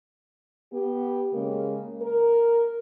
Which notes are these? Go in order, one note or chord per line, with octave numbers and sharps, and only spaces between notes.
B3 G4
C#3 G#3 A#3
A#4